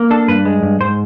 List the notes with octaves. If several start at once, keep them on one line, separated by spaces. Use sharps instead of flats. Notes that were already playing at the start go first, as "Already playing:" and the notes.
Already playing: A#3
D4 A4
G2 B4
G#3
G2
G#2 C5